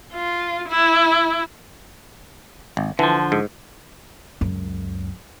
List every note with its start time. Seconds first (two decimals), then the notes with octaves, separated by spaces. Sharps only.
0.14 F4
0.68 E4
2.77 G#1
2.99 D3 E3 F3
3.32 G#2
4.41 C#2 F#2